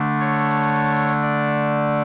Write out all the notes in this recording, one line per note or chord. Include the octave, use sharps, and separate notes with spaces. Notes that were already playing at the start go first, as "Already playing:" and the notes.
Already playing: D3 A3 D4
C#5
D5